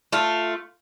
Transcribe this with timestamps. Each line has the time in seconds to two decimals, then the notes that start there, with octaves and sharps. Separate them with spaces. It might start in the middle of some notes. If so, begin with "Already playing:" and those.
0.12 A3 F4